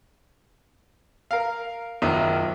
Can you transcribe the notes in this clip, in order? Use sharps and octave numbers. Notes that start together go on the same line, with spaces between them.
A#4 F5
F#1 B1 D#3 F3 E5